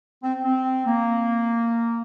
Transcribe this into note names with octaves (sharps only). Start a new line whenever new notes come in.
C4
C4
A#3